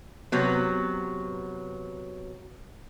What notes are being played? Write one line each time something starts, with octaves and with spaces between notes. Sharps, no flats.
C3 F#3 B3